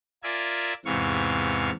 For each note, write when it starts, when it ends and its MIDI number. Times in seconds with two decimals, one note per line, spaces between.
0.23 0.73 65
0.23 0.73 70
0.23 0.73 74
0.23 0.73 76
0.23 0.73 80
0.85 1.71 40
0.85 1.71 44
0.85 1.71 48
0.85 1.71 52
0.85 1.71 77
0.85 1.71 85